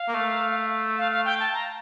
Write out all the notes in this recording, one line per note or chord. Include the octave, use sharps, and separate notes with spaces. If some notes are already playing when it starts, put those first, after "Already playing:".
Already playing: F5
A#3
A3
F5
F5
G5
A5
A#5